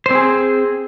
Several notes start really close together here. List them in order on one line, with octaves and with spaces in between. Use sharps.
C5 C4 G#4